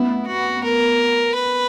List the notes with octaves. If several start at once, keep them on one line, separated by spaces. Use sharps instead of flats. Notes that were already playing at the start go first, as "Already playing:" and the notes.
Already playing: B3 E4
F#4
A#4
B4